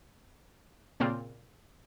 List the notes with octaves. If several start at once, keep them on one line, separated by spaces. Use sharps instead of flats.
A#2 C#3 A#3 C4 F4